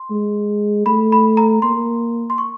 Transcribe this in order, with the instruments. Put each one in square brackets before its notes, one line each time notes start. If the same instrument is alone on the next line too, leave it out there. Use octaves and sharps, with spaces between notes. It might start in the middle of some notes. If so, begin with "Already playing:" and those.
Already playing: [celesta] C6
[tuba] G#3
[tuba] A3 [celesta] B5
[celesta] B5
A#5
[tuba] A#3 [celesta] C6
[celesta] C6
C#6